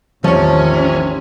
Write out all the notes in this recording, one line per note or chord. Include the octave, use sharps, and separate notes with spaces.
A1 E2 C3 D#3 F3 C#4 C#5